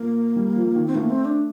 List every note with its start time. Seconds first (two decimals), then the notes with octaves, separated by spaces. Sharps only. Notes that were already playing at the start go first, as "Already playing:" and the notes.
Already playing: A#2 A#3
0.36 G3
0.56 F3
0.75 D#3
0.87 C4
0.95 A3 A#3
1.10 C4
1.25 D4